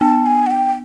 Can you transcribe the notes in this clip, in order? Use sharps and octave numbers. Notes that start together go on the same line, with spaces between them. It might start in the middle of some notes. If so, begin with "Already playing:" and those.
B3 A5
G#5
F#5
G5